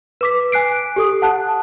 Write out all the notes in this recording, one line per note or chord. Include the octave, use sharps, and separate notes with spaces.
B4 D6 B6
G#5 F#6 C7 D7
G4 A4 D#6
F#5 A5 F#6